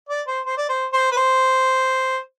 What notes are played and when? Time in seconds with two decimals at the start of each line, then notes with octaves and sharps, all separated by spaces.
0.09 D5
0.27 C5
0.46 C5
0.57 D5
0.69 C5
0.93 C5
1.12 B4
1.17 C5